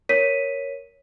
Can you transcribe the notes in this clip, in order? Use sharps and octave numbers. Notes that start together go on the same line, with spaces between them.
A#4 C#5 B6 D#7